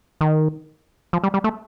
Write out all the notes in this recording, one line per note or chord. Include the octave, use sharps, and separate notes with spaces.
D#3
F3
G3
G3
A3